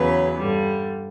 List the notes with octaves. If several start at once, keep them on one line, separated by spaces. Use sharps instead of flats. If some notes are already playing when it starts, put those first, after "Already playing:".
Already playing: E2 C#3 F#3 B4
G2 D3 G3